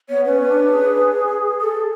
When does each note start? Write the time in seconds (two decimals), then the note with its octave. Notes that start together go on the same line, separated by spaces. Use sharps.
0.09 B3 C#5
0.25 C#4 B4
0.49 D4
0.71 G#4
1.61 A4